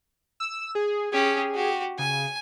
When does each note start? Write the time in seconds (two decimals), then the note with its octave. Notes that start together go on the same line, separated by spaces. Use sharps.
0.40 E6
0.75 G#4
1.12 C#4 G4 G#4
1.54 F#4 G4
1.99 C#3 G#5